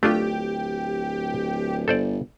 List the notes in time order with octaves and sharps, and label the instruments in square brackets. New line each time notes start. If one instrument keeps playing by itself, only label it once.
[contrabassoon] D1 [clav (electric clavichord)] A3 D4 F4 [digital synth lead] G4
[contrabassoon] G1 [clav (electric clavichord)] A4 C5 D5